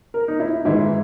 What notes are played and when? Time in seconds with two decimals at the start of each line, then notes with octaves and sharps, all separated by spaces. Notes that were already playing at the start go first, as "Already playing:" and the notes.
0.14 A#4
0.28 D#4
0.40 E4
0.65 G#2 E3 E4